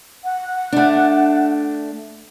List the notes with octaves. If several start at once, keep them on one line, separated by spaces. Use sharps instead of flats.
F#5
A3 D4